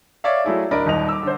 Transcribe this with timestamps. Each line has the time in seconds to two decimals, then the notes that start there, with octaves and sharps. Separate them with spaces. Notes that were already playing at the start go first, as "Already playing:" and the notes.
0.24 C#5 D5 E5 F5
0.45 F#3 A3 E4 G#4
0.71 D1 D4 A#4 D#5 B5 D6
0.86 D#1 D#2 D#5 F7
1.09 D6 E6
1.23 D3 C5